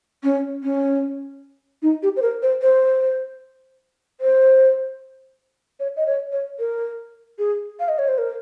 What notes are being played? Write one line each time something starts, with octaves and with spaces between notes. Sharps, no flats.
C#4
C#4
D#4
G4
C5
A#4
C5
C5
C5
C#5
D#5
C#5
C#5
A#4
G#4
F5
D#5
C#5
C5
A#4